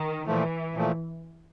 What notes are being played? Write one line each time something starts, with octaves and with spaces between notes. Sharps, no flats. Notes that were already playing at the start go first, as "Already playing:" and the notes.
Already playing: D#3
A#2 E3 F3 A3
A#2 F3 A3